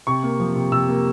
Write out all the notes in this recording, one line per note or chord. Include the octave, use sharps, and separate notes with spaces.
C3 C#6
A#3
F3
C3
C3 E6
A#3